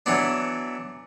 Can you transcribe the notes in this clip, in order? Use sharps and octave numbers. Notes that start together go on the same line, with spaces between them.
E3 F#3 B3 D4